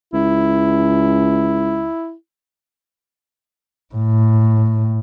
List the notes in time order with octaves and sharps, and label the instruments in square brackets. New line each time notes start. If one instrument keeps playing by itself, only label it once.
[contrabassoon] C#2 [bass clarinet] E4
[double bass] A2